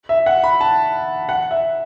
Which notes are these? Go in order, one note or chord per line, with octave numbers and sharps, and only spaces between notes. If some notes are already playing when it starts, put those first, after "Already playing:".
E5
F#5
B5
A5
F#5
E5